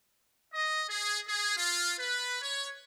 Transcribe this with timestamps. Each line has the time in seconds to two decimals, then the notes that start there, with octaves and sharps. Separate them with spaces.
0.51 D#5
0.88 G#4
1.27 G#4
1.55 F4
1.98 B4
2.41 C#5